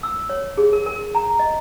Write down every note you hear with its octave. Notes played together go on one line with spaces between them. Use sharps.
E6
C#5
G#4
A#4
A#4
A#5
D#5